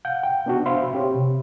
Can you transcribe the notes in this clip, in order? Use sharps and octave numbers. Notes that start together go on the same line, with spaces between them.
F5 F#5 G6
G5
B3 D4 F#4
C5 E5 F5 B5 C6
C4 G4 C#5
C3